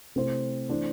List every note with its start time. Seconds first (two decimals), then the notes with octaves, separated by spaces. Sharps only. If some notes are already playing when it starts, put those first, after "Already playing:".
0.15 C3 A3 C4 E4 C5
0.69 E3 A3 D4 C5